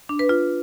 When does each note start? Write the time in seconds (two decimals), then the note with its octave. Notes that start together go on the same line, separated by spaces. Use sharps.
0.09 D4
0.19 B4
0.29 F4